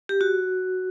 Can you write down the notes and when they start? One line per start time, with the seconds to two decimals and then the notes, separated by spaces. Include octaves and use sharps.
0.09 G4
0.21 F#4